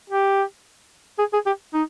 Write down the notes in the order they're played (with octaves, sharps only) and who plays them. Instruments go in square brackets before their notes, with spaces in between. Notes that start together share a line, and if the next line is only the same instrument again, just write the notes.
[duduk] G4
G#4
G#4
G4
D#4